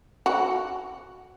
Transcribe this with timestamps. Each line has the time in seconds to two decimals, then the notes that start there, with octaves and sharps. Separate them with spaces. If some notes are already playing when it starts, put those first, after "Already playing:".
0.26 F#4